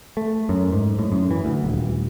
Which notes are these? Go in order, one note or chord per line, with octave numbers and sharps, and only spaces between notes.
A3
F#2
G#2
A2
F#2
E3
D2
D#1